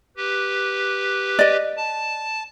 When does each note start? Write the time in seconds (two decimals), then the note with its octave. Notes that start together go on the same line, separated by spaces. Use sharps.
0.17 G4 B4
1.39 D5 D#5
1.77 A5